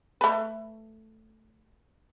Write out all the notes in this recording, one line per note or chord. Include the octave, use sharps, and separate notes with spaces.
A3 B4